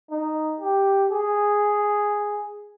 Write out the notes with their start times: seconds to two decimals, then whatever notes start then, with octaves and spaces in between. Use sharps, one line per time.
0.11 D#4
0.60 G4
1.10 G#4